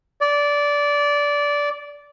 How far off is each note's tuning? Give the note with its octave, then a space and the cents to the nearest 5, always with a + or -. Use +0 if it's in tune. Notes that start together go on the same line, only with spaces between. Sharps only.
D5 -15